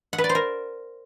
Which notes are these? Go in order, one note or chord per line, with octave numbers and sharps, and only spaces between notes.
F#5
B4
D5
C5
A#4